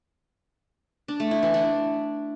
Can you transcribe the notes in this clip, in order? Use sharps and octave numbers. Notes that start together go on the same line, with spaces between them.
D4
A3
E4
E3
D4